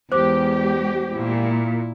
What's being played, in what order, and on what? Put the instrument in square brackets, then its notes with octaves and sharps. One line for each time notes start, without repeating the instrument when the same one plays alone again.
[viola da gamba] E2 [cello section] G#3 G4 [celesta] C5 D6
[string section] A#2 [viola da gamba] E4